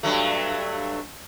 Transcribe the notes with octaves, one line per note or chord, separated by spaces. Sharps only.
G2 F#3 A3